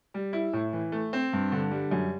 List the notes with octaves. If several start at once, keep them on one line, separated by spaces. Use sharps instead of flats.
G3
E4
A2
E3
A3
C4
G2
D3
G3
F#2